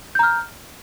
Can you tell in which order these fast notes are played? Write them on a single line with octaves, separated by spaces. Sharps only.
G6 A#5 F6